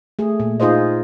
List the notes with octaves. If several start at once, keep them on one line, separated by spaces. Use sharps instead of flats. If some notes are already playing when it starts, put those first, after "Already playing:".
A3 G#4
A#2
D#4 F4 G#4 C5 D#5